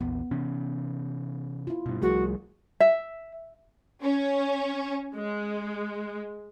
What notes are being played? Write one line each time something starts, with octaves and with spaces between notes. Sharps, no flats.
A#1 E2 B3
C3 E3 C#4
E4 F4
G2 B2
C2 F3 G3 A3 F#4 G#4 A#4
E5
C#4
G#3